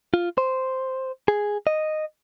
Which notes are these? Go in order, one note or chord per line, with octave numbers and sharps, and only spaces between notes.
F4
C5
G#4
D#5